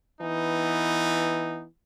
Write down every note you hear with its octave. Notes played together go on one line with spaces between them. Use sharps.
E3 B3 D#4